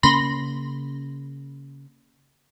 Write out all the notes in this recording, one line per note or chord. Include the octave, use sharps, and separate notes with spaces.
C#3 A#3 C#4 B5 C6 A#6